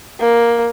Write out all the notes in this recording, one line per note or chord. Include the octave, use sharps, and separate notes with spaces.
A#3